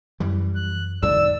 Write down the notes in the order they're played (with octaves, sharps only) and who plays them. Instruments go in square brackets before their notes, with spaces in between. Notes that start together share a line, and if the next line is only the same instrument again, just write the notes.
[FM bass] F#2 [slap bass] E3 G3
[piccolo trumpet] F#6
[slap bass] E2 G#2 D3 [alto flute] D5 [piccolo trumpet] E6